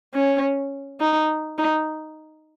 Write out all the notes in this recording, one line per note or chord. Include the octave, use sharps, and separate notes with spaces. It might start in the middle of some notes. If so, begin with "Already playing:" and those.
C#4
D#4
D#4